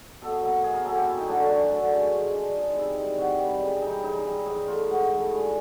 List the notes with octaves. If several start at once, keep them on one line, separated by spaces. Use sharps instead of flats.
B2 A4
F#3 A#3
B2 G#4
A#4
F#3 A#3 A4
G4
F#2 E4
D#4
D3 F#3 A3 D4
C#4
F#2 D4
D3 F#3 A3
C#3 C#4
F3 G#3
C#3 D4
F3 G#3 D#4
C3 E4
D#3 G3
C3 F#4
D#3 G3 G4
C#3
E3 G3 D#4
C#3 D#4
E3 G3
G#2 D#4
E3 A3 F4
G#2 F#4
E3 A3
G2 G#4